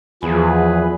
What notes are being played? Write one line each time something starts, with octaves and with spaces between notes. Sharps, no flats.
E2 F3 G#4 B4